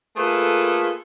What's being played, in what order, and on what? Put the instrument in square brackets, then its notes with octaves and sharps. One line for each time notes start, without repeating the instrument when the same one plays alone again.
[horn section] A3 A#3 F4 G#4 A4 B4